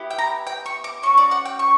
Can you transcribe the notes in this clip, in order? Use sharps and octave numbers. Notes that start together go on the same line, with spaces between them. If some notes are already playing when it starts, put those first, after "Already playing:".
Already playing: B3 E4 G4
G5
A#5
G5
C#6
D6
C#4 F#4 C#6
D5
F#5
G5
C#6